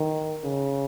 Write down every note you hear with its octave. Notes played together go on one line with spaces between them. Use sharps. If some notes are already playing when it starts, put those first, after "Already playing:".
Already playing: D#3
C#3